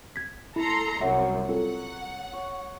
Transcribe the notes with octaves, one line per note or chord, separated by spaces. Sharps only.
G#6 B6
E4 A4 A#5 C6
C2 F#2 C3 F#3 E5
C4 F4 A4 F#5
C#5